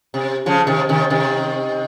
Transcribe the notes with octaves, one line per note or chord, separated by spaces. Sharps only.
C3
C#3 F3
C3 D#3
C3 D#3
C3 D#3